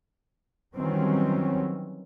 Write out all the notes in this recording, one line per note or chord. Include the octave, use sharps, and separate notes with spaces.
D#3 E3 F#3 G3 C4 C#4